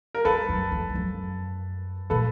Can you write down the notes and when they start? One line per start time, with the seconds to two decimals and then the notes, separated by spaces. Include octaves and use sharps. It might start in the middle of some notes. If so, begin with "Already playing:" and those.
0.15 A#4
0.25 G2 A4 B4
0.49 F#2
0.71 F2
0.89 G2
0.95 F#2
2.10 A#2 A4 B4